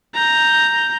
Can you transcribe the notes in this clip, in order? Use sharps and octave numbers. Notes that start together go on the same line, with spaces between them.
A#5 G6